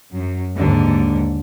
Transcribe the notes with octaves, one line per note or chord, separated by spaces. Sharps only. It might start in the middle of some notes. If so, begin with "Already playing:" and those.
F#2 F#3
D#2 G#2 D3